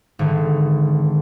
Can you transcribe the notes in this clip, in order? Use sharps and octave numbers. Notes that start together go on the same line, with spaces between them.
G#1 D3